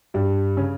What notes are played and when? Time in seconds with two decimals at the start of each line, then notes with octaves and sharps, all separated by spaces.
0.14 G2 G3
0.57 C#3 C#4